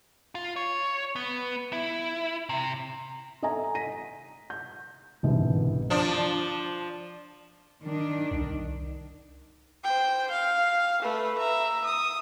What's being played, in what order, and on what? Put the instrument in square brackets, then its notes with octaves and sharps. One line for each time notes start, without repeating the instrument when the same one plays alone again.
[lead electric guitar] F4
C#5
B3
E4
C3
[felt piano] A4 D#5 E5 G#5 A#5
A#6 B6 D#7
G6
G1 C2 G#2 B2 E3
[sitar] F3 D4
[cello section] D#3 D4
[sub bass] C2
[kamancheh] C5 G5
F5
A3 B4
E5 A#5
D#6